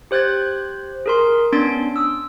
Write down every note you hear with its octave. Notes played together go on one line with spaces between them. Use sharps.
G4 C5 F#6 G#6 A6
G#4 A#4 C6
B3 C#4 D4 C6 A6 D7
D#6 E6